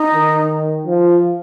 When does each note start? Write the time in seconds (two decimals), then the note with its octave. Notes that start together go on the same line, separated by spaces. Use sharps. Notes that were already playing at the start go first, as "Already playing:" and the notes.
Already playing: D#4
0.14 D#3
0.86 F3